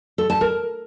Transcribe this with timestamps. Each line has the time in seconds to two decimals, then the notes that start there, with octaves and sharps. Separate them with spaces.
0.18 A4
0.30 A5
0.41 A#4